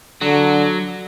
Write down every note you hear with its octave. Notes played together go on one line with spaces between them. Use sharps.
D3 F#3